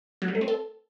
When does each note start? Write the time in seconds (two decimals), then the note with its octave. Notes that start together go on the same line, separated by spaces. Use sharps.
0.22 F#3
0.28 G3
0.35 A3
0.41 C4
0.48 A4